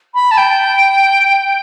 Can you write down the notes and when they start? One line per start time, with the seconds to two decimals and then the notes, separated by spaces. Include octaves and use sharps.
0.14 B5
0.31 A5
0.37 G5